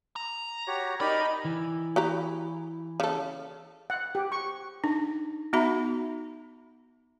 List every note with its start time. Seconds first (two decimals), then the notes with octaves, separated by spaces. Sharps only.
0.16 A#5
0.67 F#4 G4 C#5
1.00 D#4 G4 A#4 D5 B5
1.45 E3
1.96 F#4 G4 A#5
3.00 C#3 A4
3.90 F#5
4.15 G4
4.32 C#6
4.84 D4 D#4
5.53 B3 D#4 F#4 E5 A#5 B5